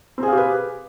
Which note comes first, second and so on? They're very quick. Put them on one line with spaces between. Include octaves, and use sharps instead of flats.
C4 G#4 F5 G4 B4